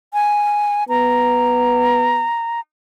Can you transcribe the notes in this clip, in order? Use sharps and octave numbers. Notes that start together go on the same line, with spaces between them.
G#5
B3 A#5